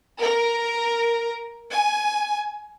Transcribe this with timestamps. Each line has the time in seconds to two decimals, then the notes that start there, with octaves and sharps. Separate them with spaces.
0.19 A#4
1.71 G#5